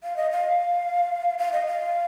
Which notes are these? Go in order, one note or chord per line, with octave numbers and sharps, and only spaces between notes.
F5
D#5
F5
F5
D#5
F5